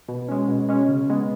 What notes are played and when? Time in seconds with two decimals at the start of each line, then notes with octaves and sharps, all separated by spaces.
0.08 B2
0.28 G#3 C#4
0.48 B2
0.69 G#3 C#4
0.89 C#3
1.10 G#3 B3